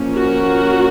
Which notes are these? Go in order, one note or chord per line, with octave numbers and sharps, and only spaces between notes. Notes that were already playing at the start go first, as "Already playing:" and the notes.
Already playing: F3 A#3 C#4
F#4 A#4